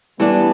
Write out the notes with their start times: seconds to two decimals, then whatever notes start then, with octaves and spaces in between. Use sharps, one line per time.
0.19 E3 G3 A3 B3 D4